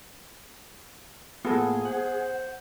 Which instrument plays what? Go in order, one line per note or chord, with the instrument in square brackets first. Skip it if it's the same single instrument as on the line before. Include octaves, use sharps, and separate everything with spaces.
[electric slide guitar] A2 A#3 F4 [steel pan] B3 A4 [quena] G#4
[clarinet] C5 [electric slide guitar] F#5